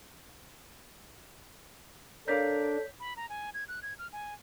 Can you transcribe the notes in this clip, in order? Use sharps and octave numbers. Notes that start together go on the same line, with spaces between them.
D4 A4 A#4 C#5 D5 F5 G6 B6
B5
A#5
G#5
G#6
F#6
G#6
F6
G#5